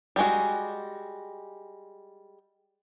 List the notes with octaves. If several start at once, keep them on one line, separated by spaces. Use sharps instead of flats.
G3 G#3 F#4